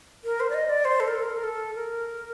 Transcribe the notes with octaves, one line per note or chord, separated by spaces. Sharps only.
A#4
C5
D5
D#5
D5
C5
A4
A#4
A4
A#4
A4
A#4
A4
A#4